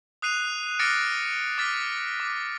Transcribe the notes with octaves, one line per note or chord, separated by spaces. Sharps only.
D#6 F#6 C7 D#7 F7
D6 F6 A6 A#6 C#7 D7
D6 F6 A6 B6
D6